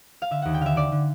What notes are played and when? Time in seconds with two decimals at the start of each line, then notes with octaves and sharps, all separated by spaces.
0.22 F5
0.31 D3 E5
0.42 D#2 F#5
0.54 G5
0.61 D3 E5 F5
0.76 D3 D5
0.92 D3